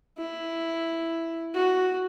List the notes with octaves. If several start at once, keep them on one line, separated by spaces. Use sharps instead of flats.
E4
F#4